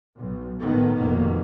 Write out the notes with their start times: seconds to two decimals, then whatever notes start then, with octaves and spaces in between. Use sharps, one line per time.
0.17 B1
0.60 A2 D#3 B3
0.94 F1 F2 B2 D#3 A#3